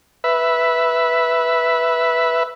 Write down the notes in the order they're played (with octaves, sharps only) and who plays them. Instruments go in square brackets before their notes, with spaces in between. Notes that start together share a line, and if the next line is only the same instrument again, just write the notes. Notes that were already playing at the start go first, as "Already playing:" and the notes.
[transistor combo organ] B4 E5